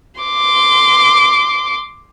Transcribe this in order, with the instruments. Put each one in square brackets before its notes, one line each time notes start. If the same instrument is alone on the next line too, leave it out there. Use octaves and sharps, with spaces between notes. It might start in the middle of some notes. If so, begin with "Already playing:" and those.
[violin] C6 D6